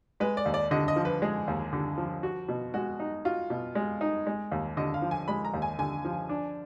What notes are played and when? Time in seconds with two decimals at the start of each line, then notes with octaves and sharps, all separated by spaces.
0.20 G#3 B4
0.37 D5
0.46 D#2
0.54 D5
0.71 D3 D#5
0.88 D#5
0.96 F3
1.05 B4
1.22 G#3 G#4
1.48 D#2
1.73 D3
1.98 F3
2.23 F#4
2.49 B2
2.74 G#3 F#4
3.00 D#4
3.25 F4 F#4
3.50 B2
3.75 G#3
4.01 D#4
4.27 G#3
4.52 D#2
4.77 D3 D#5
4.94 F5
5.02 F3
5.11 G#5
5.28 G#3 B5
5.45 A#5
5.53 D#2
5.62 G#5
5.79 D3 G#5
6.04 F3
6.29 D4